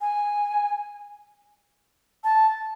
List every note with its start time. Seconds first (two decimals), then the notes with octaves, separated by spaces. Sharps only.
0.01 G#5
2.24 A5